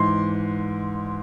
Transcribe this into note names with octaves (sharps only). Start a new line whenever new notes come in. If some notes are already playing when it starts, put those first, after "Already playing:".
Already playing: G#2 E3 C6